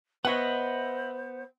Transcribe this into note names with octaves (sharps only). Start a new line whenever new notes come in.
B3 C5 C#5 D#5 E5 F#5